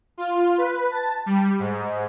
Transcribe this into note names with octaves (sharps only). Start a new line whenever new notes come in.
F4
B4
A5
G3
G#2